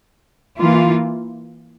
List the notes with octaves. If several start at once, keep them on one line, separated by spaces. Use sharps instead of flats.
E3 A#3 F4